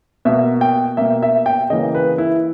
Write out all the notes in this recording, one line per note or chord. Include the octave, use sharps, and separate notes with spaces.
B2 A#3 E5
G5
B2 A#3 E5
E5
G5
C#3 E3 A#3 D#5
B4
E4